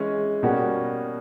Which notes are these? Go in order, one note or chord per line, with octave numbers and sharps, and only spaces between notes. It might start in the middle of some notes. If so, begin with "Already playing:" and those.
Already playing: E3 G#3 C#4 E4
B2 G3 A#3 C#4 F#4